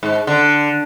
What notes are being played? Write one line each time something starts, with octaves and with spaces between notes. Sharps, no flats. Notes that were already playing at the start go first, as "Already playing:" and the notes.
G#2
D3